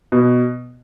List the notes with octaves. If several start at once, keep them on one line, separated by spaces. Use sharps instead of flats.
B2